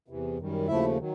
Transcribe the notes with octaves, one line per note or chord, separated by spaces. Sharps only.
E2 C3 E3
F#2 D#3 G3
D#2 C#3 F3 A3 E4 E5
D#3 F#3